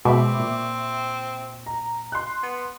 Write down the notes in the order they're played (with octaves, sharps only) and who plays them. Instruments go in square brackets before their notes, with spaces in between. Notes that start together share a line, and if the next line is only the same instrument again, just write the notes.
[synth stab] B2 [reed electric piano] G#3 B5 [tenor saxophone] C4 [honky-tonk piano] E5 C#6 D6
[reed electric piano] A#2
[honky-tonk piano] A#5
C6 F#6
[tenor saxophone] B3